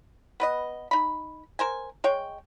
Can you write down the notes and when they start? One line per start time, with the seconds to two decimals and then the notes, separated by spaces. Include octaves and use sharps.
0.40 B3 B4 D#5
0.91 D#4 B5
1.59 A#4 C5 G#5
2.04 G#3 C#5 G5